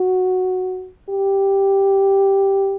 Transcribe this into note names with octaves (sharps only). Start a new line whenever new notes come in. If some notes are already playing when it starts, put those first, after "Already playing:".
Already playing: F#4
G4